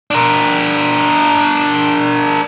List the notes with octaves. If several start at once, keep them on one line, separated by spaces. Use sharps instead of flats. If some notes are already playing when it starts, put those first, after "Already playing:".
D4 A#4